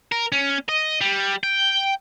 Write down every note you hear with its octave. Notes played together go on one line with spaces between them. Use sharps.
A#4
C#4
D#5
G3
G5